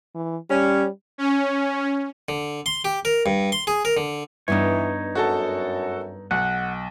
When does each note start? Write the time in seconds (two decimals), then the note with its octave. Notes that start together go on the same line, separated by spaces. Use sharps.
0.15 E3
0.50 G3 C#4
1.18 C#4
2.29 D3
2.66 C6
2.85 G4
3.05 A#4
3.26 G2
3.52 C6
3.67 G#4
3.85 A#4
3.97 D3
4.48 G2 E3 B3 D4 D#4 C#5
5.15 F#2 F#4 A4 A5
6.31 B1 F#5